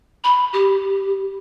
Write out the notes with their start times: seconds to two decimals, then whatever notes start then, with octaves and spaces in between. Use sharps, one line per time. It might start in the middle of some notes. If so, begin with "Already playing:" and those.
0.24 B5
0.53 G4